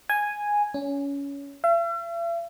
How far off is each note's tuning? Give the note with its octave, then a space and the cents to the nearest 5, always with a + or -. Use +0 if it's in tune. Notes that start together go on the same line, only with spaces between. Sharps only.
G#5 -5
C#4 +20
E5 +45